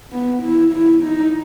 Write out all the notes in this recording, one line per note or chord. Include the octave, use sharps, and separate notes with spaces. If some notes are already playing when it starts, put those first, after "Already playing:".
B3
E4
E4
D#4